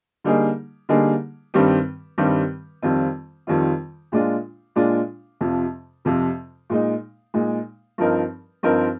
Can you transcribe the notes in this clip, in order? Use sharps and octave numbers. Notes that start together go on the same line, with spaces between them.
D3 G3 A#3 D#4 G#4
D3 G3 A#3 D#4 G#4
G2 D#3 G3 C4 G4
G2 D#3 G3 C4 G4
F2 D#3 G3 C4 F4
F2 D#3 G3 C4 F4
A#2 G#3 D4 F4
A#2 G#3 D4 F4
F2 C3 F3
F2 C3 F3
A#2 G#3 D#4
A#2 G#3 D#4
G2 F3 C4 D#4 A#4
G2 F3 C4 D#4 A#4